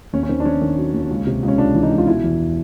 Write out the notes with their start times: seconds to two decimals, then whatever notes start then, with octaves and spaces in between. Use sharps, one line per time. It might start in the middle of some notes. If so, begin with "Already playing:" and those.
0.13 D#2 C#4
0.23 C#4
0.29 D#3 C4
0.40 D4
0.45 D#3 C#4
0.62 D#3
0.77 F#3
0.94 D#2
1.10 C#2
1.27 C3
1.43 C#2
1.48 C#4
1.58 C#2 D4
1.75 E3
1.83 D#4
1.91 C#2
1.98 F4
2.07 B2 E4
2.24 E2